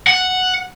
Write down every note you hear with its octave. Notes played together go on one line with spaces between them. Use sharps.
F#5